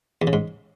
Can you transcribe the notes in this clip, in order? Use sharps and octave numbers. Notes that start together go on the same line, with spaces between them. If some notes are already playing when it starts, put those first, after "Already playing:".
E2
C#3
G#2